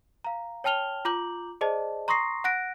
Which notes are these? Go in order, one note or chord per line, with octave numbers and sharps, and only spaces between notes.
F5 A#5
C#5 G5 A5 F6 F7 G7
F4 A#5 D6 G6 F#7
G#4 C5 D5 D#5 A5
A#5 C6 C#6 D#6 A#6 C7
F#5 F#6 A#6 D7